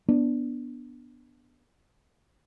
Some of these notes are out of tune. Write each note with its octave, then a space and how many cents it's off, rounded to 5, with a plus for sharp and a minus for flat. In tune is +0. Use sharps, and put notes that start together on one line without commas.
B3 -10 D4 +0